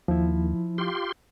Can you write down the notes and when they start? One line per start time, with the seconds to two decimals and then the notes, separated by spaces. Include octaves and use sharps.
0.08 D#2 F3 E4
0.78 F4 G4 C6